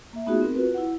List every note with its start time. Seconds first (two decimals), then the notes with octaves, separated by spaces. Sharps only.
0.13 A#3 E5
0.26 A3 B3 D#4 F4 F#4 G#4
0.41 C4 A#4
0.55 F4 F#4 B4
0.74 E4 F#5